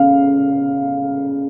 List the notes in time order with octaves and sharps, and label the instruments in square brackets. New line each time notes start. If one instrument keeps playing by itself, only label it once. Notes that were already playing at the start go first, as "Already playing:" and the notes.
Already playing: [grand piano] C#3 F5